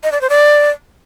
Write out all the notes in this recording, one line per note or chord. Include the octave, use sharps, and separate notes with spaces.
D#5
D5
C5
D5